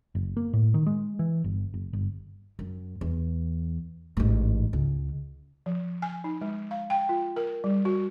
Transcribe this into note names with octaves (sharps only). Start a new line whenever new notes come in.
F#1
A#3
A2
D#3
G#3
E3
G1
F#1
G1
F#2
E2
A1 G#2
C#2
F3
G#5
D#4
G#3
F5
G5
F4
A#4
G3
F#4